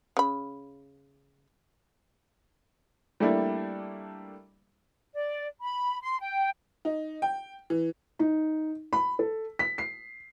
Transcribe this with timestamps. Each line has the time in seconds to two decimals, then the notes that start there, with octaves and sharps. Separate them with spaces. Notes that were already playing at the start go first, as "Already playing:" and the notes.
0.17 C#3 B5
3.20 G3 A3 A#3 D4 E4
5.14 D5
5.60 B5
6.01 C6
6.19 G5
6.85 D#4
7.22 G5
7.70 E3
8.19 D#4
8.93 B5
9.19 A4
9.59 B6
9.78 C7